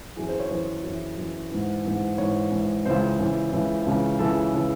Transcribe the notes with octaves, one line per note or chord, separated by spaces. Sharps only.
F#2 E3 G#4
C5
C#5
F#2 E3 C5
F#2
E3
F#2 E3
G#2 E3
G#2 E3
G#2 E3 C#5
G#2 E3
C#2 C#3 E3 C5
C#2 C#3 E3
C#2 C#3 E3
C#2 C#3 E3
C#2 C#3 E3 A4
C#3 E3